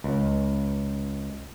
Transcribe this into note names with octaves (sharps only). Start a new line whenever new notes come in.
C#2